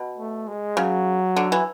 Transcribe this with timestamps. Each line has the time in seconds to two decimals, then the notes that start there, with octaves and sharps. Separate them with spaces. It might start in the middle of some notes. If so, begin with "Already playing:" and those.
Already playing: B2
0.18 A3
0.47 G#3
0.77 C#3 F#3
1.36 D3
1.52 E3